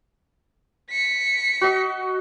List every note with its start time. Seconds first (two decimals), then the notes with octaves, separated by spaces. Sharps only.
0.91 B6 C#7
1.61 F#4 D#5